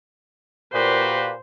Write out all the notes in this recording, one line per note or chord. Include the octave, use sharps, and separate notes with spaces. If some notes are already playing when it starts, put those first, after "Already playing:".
A#2 F#4 G4 B4 C5